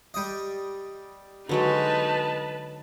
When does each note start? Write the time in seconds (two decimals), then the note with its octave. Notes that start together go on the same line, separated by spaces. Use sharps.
0.14 G3 D#5
1.49 D3 F#3 G#3 D#4 B4 A5